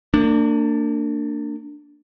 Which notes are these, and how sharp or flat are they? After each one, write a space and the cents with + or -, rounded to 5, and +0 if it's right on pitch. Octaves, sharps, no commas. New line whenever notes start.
A#3 -40 D4 +0